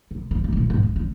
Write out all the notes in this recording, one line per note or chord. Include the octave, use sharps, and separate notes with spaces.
C3
C#3
C3
G#2
A#2
G#2
C#3
C#3